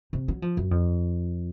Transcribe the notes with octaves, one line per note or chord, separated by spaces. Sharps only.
C3
F#3
F3
F#2
F2